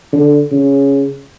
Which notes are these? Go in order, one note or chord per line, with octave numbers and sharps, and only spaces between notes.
D3
C#3